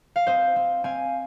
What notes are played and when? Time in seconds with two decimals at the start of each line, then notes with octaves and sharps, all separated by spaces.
0.16 F5
0.27 C4 C5 D#5
0.56 C4
0.84 C4 F5 G#5